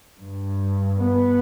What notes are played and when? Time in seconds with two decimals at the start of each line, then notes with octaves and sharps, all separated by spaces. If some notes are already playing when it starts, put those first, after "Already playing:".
0.18 G2
0.99 B3